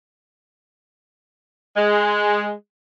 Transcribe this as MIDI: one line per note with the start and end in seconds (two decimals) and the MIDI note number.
1.77 2.51 56